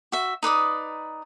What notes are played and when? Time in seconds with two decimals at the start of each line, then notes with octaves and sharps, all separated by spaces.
0.12 F#4 E5
0.43 D#4 B4 D5 D#6